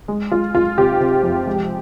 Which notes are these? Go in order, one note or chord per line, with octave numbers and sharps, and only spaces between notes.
G#3
G#3 F4
G#3 F4
C3 G4
C3
F2
G#3